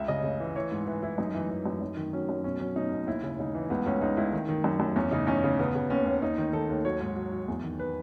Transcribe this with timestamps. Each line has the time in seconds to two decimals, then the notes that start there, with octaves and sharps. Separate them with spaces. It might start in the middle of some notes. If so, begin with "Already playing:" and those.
Already playing: C#2 E5
0.08 C#3 D#5
0.24 C#3
0.40 E3
0.56 E3 C#5
0.71 G#2
0.86 E3 B4
1.03 G#2 E4
1.18 F#2 D#4
1.34 E3
1.50 E3 E4
1.66 F#2
1.81 F#2 D#4
1.97 D#3
2.13 F#3 C#4
2.29 F#2
2.44 B2 C#4
2.60 F#3 C#4
2.76 B2 D#4
2.92 B2
3.07 D#2 E4
3.23 C#3
3.39 C#3 D#4
3.55 E3
3.70 C#2 B3
3.86 C#2 C#4
4.01 C#2 D#4
4.17 C#2 E4
4.33 D#3
4.49 D#3
4.64 F#2
4.80 F#2
4.96 E2 C#4
5.11 C#3 D#4
5.27 E2 C#4
5.44 C#3
5.59 C#3 B3
5.75 C#3
5.90 D#2 C#4
6.06 D#2
6.21 D#2 D#4
6.38 D#3
6.53 D#3 A4
6.69 D#2
6.85 F#3 C#5
7.00 G#2
7.16 F#3
7.32 F#3
7.48 E2
7.64 D#3
7.79 B4